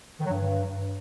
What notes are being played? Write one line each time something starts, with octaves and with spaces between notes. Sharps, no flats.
D#3
F#3
G2